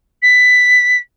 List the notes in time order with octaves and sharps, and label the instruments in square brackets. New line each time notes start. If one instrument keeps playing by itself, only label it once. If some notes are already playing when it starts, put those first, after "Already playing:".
[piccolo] B6